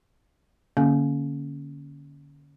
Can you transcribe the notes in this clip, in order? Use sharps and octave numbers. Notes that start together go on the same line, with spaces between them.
D3 A#3 C#4